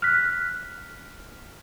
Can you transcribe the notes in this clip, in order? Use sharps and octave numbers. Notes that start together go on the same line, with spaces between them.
F6 F#6 B6